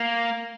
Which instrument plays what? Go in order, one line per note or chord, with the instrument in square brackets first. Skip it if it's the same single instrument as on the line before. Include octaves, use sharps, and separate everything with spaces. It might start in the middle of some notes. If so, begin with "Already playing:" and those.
Already playing: [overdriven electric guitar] A#3